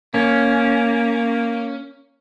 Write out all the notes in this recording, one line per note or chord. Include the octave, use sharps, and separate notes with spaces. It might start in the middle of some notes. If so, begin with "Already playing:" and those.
A#3 C#4